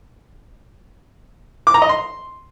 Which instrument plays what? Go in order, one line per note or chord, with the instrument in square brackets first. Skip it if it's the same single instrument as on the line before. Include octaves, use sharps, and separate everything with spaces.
[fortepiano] D6
A#5
D#5
C6